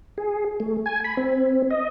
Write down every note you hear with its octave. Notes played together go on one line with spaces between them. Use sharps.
G#4
A3
G#5
B5
C4
D#5